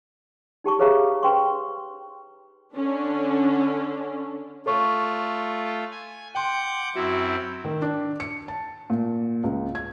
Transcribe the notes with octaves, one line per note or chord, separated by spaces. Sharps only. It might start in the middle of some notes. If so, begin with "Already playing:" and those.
D#4 G4 A5 C#6
G#4 B4 C#5 E5 F5 A#5
B4 G5 C6 C#6
D3 C#4 D4
A3 F4 A4 C#5 C#6
G#5
F#5 G5 C6 D6 G6
F#2 C4 E4 F#4
D#3
D4
C#7
A5
A#2
C#2
G#6